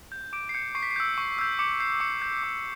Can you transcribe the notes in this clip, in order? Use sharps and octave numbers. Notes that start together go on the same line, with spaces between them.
G6
D6 D7
C7
G6 C#7
C#6 C7
B6
C7
E6 G6
C#6
E6 G6
D6 C#7
G6 C7
D6 C#7
G6
D6